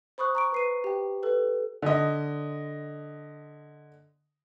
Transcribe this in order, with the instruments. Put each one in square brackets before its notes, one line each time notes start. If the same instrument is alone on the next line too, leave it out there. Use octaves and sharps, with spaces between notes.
[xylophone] C5 B5 C#6 D#6 F#6
A#5 C#6 D7
B4 C7 D#7
G4 G5
A4 B4
[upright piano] D3 D#5